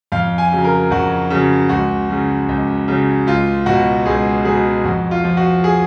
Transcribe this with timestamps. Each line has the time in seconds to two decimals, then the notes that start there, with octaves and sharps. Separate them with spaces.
0.12 F2 F5
0.38 G#5
0.52 C#3 F#3
0.64 A#4
0.91 F2 F#4
1.30 C#3 F#3
1.69 C#2 F#4
2.09 C#3 F#3
2.48 C#2
2.88 C#3 F#3
3.27 C#2 F4
3.66 B2 F#3 F#4
4.06 C#2 G#4
4.45 B2 F#3 G#4
4.84 F2 F#4
5.11 F4
5.24 F3
5.37 F#4
5.64 G#4